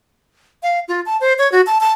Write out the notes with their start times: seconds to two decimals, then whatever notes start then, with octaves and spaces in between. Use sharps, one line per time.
0.63 F5
0.88 F4
1.06 A5
1.21 C5
1.38 C#5
1.52 F#4
1.67 A5
1.81 A5